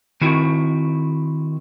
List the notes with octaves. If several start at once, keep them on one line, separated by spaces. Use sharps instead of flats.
D#3 C4 E4 F#4